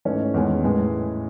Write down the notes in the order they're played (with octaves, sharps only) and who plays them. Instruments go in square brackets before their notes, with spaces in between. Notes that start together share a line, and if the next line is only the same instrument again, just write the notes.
[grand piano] G#2 E3 A3 C#4 C#5
E2 D#3 G#3 C#4
A2 E3 G#3